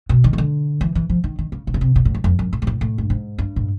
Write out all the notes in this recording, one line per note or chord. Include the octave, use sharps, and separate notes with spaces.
B2
D#3
C#3
D3
E3
E3
F3
D#3
D#3
C#3
C3
C#3
C3
A#2
A2
E2
F2
F#2
A2
G#2
A2
A2
G2
G#2
G2
A2